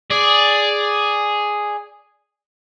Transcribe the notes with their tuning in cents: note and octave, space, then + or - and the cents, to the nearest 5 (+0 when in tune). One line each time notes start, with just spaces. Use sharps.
G#4 +0 D5 +0